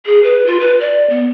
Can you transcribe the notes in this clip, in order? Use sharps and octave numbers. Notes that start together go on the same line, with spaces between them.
G#4
B4
F4
B4
D5
B3